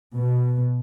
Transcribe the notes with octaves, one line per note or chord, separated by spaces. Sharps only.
B2